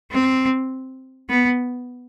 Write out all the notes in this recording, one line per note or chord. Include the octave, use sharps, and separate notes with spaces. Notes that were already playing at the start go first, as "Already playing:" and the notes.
C4
B3